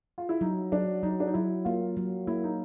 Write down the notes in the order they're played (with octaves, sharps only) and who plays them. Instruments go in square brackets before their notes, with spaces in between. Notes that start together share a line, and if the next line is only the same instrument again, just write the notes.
[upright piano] F4
E4
[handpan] F#3 [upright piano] D#4
[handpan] F#3 [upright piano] D4
[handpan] F#3 [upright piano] D#4
[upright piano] D4
D#4
[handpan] F#3 [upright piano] E4
[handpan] A#3 [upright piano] F4
[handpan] F#3
[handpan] A#3 [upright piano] E4
[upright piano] D#4